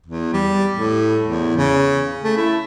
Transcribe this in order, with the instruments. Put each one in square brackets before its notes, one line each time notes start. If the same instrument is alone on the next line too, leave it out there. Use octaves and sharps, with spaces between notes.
[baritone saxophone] E2
G3
A2
E2
C#3
A3
E4